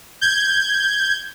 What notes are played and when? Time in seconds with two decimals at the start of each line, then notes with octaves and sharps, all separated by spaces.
0.21 G6 G#6